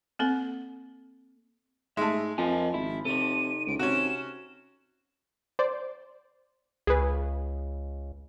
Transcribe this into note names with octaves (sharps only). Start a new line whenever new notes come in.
A#3 C4 A4
G#2 G#3 A3 E5
F2 F3 A#4 D#5 G#5
G#1 E4
C3 D#4 A4 D#7
C#2 D7
C3 C#4 F#4 E7
C5 D5
C#2 G#4 B4